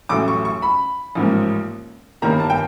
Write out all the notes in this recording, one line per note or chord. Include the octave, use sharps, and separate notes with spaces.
A1 A2 F#3 A3 D6
C#6
C#6
B5
A1 G#2 F3 A#3
G1 G2 D#3 G3 A#3 A#5
A5
G5